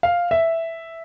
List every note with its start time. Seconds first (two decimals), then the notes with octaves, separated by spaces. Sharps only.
0.03 F5
0.31 E5